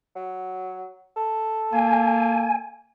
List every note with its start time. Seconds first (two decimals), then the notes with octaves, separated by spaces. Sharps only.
0.15 F#3
1.16 A4
1.73 A#3 G#5